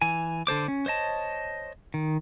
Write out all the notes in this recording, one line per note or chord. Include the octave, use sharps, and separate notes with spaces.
E3 G#5
D3 A4 C5 D6
C#4
C5 C#5 D#5 A5
D#3